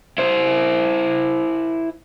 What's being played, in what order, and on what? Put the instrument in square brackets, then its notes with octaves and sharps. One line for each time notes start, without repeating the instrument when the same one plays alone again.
[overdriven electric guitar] E4 C5